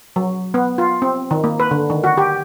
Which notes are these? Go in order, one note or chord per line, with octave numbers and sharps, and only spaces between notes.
F#3
B3
F4
C4
D#3
A#3
B4
D3
D#3
F#4
G4